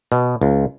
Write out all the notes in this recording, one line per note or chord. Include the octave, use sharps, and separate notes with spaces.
B2
C#2